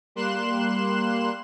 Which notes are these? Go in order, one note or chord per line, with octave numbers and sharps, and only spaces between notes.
G3 A#3 C6 F#6 E7